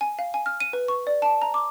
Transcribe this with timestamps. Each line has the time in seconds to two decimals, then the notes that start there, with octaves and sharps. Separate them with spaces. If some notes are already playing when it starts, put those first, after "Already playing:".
0.01 G#5
0.19 F5
0.34 G#5
0.46 F6
0.60 D#7
0.73 B4
0.88 C#6
1.07 D5
1.22 A5
1.42 A#5
1.54 D6